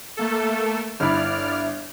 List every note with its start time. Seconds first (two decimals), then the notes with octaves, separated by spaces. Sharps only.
0.17 A3 A#3 A4
1.00 G1 E4 D5 B5 F6